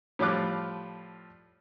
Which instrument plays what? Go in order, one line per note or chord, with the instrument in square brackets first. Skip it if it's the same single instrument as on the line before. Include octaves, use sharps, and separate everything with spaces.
[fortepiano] A2 F3 G3 F4 D6 F#6